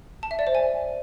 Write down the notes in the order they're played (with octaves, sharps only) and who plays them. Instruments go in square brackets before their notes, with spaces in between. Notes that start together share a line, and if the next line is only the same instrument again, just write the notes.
[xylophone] A5
E5
D5
C5
G#5